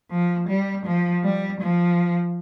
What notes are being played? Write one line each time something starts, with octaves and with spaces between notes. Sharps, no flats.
F3
G3
F3
G3
F3